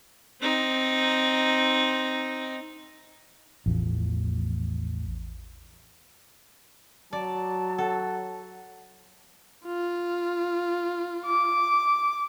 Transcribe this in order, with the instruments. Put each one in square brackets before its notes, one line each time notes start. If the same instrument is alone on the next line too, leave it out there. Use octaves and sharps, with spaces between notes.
[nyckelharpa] C4 D#4
[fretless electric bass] A1 E2 F3
[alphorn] F#3 [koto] D5 [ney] A5
[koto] A4 [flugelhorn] F#5
[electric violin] F4
[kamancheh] D6